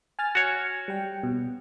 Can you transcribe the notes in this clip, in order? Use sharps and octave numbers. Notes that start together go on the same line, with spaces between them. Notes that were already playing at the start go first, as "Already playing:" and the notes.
G#5 F6 A6
F#4 C#5
G3 G5
B2